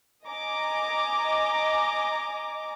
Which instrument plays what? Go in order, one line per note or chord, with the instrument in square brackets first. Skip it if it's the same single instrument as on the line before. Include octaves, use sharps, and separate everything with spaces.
[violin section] D#5 G#5 A#5 D6